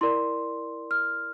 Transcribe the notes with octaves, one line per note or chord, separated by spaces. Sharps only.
E4 A#4 D5 C6
F6